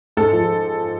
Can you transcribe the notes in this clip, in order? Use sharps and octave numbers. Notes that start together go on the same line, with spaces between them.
G#2 A4
F3